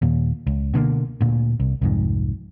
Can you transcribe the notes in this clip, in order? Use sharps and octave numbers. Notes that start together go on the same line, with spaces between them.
D#2 A#2
C#2
B2 D3 G#3 A#3
D2 A#2
C2
C2 F2 G#2